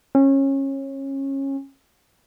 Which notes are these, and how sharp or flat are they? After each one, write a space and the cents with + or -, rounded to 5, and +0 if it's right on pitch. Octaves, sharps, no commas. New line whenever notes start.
C#4 -25